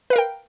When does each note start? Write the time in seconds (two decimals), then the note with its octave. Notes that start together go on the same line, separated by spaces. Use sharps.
0.10 B4
0.13 F5
0.16 A#4
0.18 G5